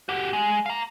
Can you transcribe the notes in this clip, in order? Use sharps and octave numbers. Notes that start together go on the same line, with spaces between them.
F#4 G4
G#3
F5 A#5